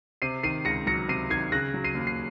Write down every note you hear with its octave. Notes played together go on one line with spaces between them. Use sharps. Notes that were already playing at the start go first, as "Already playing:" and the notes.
C3 C7 D#7
D#3 C7 D#7
C#2 A#6 C#7
F#3 A#6 C#7
C3 C7 D#7
D#3 G#6 C7
C#3 F#6 A#6
F#3
C7 D#7
D#2
C7